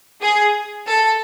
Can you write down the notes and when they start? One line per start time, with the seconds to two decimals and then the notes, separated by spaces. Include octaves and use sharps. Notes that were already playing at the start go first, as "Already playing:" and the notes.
0.22 G#4
0.88 A4